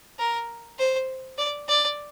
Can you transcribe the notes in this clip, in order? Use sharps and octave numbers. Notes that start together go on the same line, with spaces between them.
A#4
C5
D5
D5